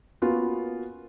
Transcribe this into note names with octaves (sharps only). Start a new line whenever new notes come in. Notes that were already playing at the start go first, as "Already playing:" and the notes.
A#3 B3 C#4 F4 F#4